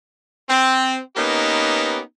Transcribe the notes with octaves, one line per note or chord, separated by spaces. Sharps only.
C4
A#3 B3 C#4 D#4 G4 B4